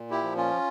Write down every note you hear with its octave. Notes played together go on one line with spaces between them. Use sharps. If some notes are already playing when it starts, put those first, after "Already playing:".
Already playing: A#2
E4 G4
F3
C#4 F4